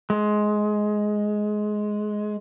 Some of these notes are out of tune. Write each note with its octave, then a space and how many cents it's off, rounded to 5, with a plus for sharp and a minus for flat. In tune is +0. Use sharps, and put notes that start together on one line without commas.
G#3 +15